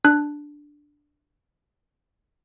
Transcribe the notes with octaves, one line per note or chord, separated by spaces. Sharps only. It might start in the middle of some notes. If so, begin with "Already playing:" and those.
D4 F#6